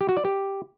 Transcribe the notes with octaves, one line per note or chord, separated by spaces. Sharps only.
G4
F#4
D5
G4